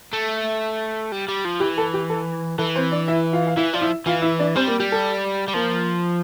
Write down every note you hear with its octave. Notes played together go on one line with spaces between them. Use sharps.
A3
G3
G3
F3
E3 G4
A4
G4
A4
E3 A4
C4 C5
D4 D5
E4 E5
F4 F5
F5
E3 E4 E5
F3 D5
E4 E5
E3 F4 F5
E4 E5
D4 D5
G3 C4 C5
A#3 A#4
G3 G4
A4
G3
F3 A#3 A#4